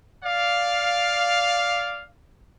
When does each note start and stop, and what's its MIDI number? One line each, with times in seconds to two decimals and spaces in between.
0.23 2.07 74
0.23 2.07 77